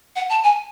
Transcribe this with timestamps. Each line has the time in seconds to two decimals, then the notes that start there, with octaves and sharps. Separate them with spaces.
0.16 F#5
0.30 A5
0.44 G#5